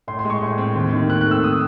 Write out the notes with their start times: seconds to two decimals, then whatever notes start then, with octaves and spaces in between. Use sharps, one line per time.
0.08 A2 C6
0.19 C6
0.25 G#3
0.30 C#6
0.42 A2
0.58 C4
0.76 D#2
0.93 D#3
1.10 C4 F#6
1.21 F#6
1.27 A3 E6
1.44 D#6